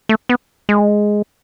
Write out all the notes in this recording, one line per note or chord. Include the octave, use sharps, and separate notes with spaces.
A3
B3
G#3